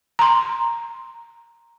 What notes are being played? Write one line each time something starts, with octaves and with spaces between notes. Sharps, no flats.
A#5 C6